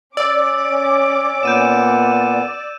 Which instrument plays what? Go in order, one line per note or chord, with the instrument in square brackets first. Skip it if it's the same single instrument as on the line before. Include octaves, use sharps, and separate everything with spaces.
[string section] C#4 D6 [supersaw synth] D5 [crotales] E6
[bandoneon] A#2 B3 [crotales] G6 D#7 E7